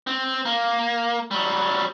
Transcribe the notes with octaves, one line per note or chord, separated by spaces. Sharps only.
C4
A#3
F#3 G3